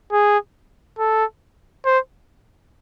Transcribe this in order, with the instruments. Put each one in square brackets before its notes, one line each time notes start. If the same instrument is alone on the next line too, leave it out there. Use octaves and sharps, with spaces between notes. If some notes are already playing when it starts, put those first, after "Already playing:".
[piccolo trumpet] G#4
A4
C5